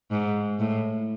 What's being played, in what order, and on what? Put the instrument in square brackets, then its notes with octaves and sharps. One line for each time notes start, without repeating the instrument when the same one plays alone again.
[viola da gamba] G#2
A2